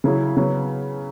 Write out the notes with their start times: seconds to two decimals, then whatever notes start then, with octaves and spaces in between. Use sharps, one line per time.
0.04 C#3 F#3 E4 G#4
0.36 C#3 F#3 B3